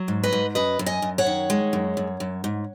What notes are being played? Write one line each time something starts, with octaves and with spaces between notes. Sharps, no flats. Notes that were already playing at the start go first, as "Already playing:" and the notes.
Already playing: F#3
G#2
B4 D#5
G#2
F#2 B4 D#5
F#2
D#5 G#5
F#2
C#5 F#5
D#3
G#3
F#2
F#2
F#2
G#2